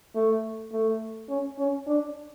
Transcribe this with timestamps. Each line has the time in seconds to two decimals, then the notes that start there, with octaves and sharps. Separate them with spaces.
0.15 A3
0.72 A3
1.29 C#4
1.59 C#4
1.87 D4